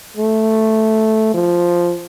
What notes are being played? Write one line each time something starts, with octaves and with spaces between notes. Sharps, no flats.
A3
F3